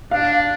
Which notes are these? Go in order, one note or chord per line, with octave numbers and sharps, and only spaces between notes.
D4 F5